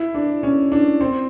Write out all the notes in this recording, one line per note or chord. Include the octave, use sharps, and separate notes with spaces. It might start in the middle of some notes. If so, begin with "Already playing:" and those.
Already playing: E4
D4
C#4
D4
C4